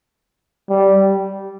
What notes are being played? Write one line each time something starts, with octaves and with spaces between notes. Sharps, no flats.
G3